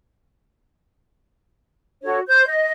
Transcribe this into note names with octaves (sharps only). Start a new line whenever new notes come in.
D4 F#4 A4 C#5
C5 G6
D#5